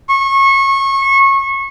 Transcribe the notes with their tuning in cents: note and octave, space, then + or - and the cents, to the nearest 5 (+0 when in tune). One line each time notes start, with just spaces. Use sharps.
C#6 -25